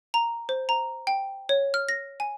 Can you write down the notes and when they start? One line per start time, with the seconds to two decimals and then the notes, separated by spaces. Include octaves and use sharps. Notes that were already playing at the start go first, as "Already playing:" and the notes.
0.14 A#5
0.49 C5
0.69 A#5
1.07 G5
1.49 C#5
1.74 F6
1.89 A#6
2.20 G#5